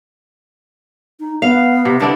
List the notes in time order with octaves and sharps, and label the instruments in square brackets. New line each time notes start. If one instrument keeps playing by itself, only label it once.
[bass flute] D#4
[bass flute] B3 [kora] F5
[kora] C3
[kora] D3 D4 E4 [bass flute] B4